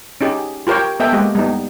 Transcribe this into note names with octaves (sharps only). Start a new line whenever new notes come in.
C#4 D#4 G4 G#4
F4 G4 A#4 C#5 G5
B3 A4 D#5 E5 G5 G#5
G#3 A#3 G4 D#5
G3 B3 D#4